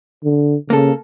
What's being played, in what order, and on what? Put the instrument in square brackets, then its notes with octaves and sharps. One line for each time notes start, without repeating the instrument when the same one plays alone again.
[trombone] D3
[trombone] C#3 [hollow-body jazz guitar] A#3 A4